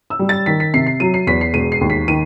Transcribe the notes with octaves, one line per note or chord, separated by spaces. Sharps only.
E6
G3
A6
D#3 B6
B6
C3 C7
C7
F#3 D#7
C7
E2 B6
C7
E1 D#7
C7
D#2
B6
D#3 D#7